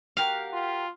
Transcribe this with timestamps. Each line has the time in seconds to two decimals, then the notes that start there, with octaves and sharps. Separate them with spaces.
0.17 F#4 G4 A#4 F5
0.53 F4